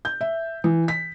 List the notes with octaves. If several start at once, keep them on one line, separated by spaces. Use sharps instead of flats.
G6
E5
E3
B6